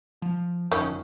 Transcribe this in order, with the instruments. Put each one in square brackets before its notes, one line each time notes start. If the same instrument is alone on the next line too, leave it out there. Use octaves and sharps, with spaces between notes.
[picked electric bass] F3
[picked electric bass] G1 F2 [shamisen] D#3 C#4